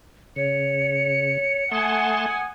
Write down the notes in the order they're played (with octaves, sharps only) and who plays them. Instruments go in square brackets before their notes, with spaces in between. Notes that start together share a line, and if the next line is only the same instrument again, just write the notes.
[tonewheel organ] C#3 [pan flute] C#5 [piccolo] C#7
[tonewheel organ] A3 A5 C6 [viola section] F#5 G#5 [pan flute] D#6